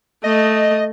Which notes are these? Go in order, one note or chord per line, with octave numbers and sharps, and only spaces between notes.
A3 D#5